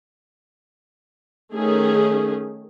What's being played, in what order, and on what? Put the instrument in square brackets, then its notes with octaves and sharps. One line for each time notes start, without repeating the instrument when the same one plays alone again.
[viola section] D#3 A3 C#4 G#4